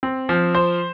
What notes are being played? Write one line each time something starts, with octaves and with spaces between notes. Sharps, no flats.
C4
F3
C5